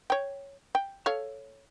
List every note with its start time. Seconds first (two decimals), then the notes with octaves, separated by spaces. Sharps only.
0.10 C#5 G5
0.75 G5
1.06 A4 C#5 F5